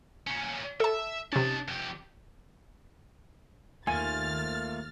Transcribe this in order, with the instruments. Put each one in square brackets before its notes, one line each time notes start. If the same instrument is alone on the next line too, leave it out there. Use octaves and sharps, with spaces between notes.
[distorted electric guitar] A#2 C#4
[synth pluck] A4 A5 [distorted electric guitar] E5
[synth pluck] C3 C#4 [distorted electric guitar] D#4 A5
[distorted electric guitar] F2 G4
[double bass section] D#2 [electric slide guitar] A3 A#3 F4 [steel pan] G#5 [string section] F6 A6